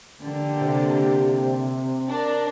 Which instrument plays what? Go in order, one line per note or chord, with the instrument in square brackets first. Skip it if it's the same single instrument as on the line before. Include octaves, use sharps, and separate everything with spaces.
[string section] D3 A#3 G4
[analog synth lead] C3
[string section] D4 A#4